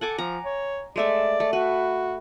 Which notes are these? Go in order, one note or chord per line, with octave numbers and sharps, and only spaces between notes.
A4 F#5 G#5 D6
F3 A#5
C#5
G#3 A3 D5 E5
A3
F#4 B4